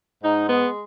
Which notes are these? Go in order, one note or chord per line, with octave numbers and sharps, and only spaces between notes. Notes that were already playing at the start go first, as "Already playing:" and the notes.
G#2 D#4
G#3 B3